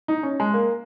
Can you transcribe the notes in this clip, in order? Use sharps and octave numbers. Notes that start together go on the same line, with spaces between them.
D#4
C#4
G#3
A#3